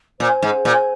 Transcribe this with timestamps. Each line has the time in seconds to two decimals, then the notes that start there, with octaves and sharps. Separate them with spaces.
0.19 A#2 C5
0.42 G#2
0.65 A#2